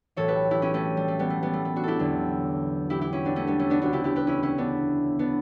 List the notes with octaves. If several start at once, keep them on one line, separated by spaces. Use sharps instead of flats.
B1 A2 E3 A4 C#5
G4 B4
E4 G4
C#4 E4
A3 C#4
G3
A3
G3 B3
A3
G3 B3
A3
A3
D4 F#4
E4 G4 A4
E2 D3 F#3
E4 G4
E4 G4
C#4 E4
B3 D4
A3 C#4
G3 B3
A3 C#4
B3 D4
E1 D2 C#3 D4 F#4
E4 G4
E4 G4
G4 B4
C#4 E4
C#4 E4
B3 D4
B3 D4